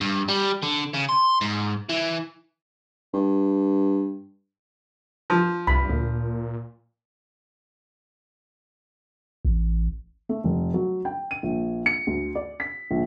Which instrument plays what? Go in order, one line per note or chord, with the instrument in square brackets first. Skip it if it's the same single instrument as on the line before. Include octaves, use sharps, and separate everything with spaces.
[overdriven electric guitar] G2
G3
D3
C#3
C6
G#2
E3
[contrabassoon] G2
[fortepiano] F3
[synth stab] C2 [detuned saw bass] G2 [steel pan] B5
[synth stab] D2 [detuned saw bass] A#2
[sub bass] A1
[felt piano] A3
F1
F#3
G5
D#7
A#1
C#7
D2
D5
B6
A#1